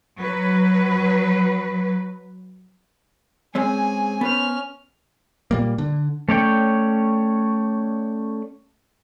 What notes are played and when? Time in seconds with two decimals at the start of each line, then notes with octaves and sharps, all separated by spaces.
0.18 F#3 B4
3.55 G#3 C4 C#4 G#4 G#5
4.21 B3 C#4 B4 C5 F6
5.51 A#2 G3 A#3
5.78 D3
6.29 A3 C#4 C#5 D5 G5